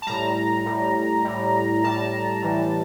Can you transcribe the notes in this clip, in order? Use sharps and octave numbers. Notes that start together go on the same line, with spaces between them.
A5
A2 G3 A#5
A2 G3
A2 G3
A2 G3 A5
A2 E3 G3